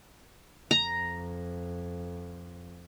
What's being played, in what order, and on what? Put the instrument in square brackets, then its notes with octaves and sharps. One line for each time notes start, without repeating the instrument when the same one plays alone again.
[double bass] F2 [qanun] A#5